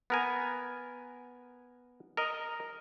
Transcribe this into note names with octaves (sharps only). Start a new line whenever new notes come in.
B3 A#4 G#5
A#4 D#5